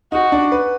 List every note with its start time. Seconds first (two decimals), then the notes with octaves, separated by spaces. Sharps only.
0.12 D#4 F#4
0.32 D4
0.52 B4